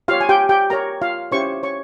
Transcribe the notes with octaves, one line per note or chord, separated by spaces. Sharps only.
F4 G4 C#5 F5
G#5
G4 G5
G4 G5
G4 A#4 C#5 A#5
F4 F5
C#4 E4 G4 C5 C#5 C#6
C#5 C#6